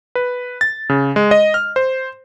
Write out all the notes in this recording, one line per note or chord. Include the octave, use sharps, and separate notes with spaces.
B4
A6
C#3
G#3
D#5
F6
C5